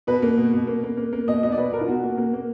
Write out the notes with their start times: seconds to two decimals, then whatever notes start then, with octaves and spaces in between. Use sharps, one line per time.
0.07 B2 B4
0.22 A#3
0.37 B2
0.53 B2
0.67 A#3
0.83 A#3
0.97 A#3
1.13 A#3
1.28 B2 D#5
1.43 B2 D#5
1.52 D5
1.57 B2 B4
1.72 B2 A#4
1.81 F4
1.88 B2 F#4
2.04 A#3
2.18 A#3
2.33 A#3